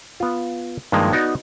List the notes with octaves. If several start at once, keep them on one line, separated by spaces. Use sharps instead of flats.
B3 F4
G2 D#3 F3 G#3 A#3
B3 D#4 F#4 D5